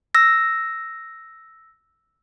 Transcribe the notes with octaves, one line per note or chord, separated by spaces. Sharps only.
E6 A#6